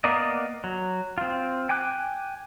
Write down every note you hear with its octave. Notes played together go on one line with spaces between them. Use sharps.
A#3 B3 A#4 D5 D#5
F#3
C4 F4
G5 G#5 D6 F#6